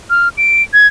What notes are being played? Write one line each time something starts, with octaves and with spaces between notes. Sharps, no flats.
F6
D7
G#6